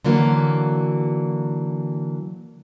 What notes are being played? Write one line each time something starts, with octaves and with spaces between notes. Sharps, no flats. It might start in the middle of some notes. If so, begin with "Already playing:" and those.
D3 E3 F#3 A#3